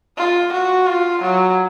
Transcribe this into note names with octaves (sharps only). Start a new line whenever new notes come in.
F4
F#4
F4
F#3